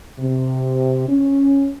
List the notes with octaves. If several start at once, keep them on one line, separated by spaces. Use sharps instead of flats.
C3
C#4